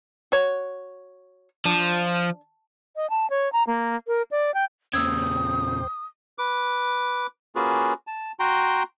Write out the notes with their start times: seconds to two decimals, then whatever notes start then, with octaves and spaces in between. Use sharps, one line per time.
0.32 F#4 C#5
1.65 F3 D4
2.96 D#5
3.10 A5
3.30 C#5
3.53 A#5
3.67 A#3
4.07 A#4
4.31 D5
4.54 G5
4.93 E2 A#2 C#3 C5 G5 D#6 E6 G#6
6.38 B4 D6
7.55 A#3 C#4 F4 F#4 G#4 B4
8.07 A5
8.40 F#4 G5 A#5 C6